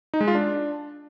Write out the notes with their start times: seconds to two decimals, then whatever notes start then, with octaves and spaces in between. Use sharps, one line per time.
0.14 D#4
0.21 G#3
0.28 F4
0.35 D4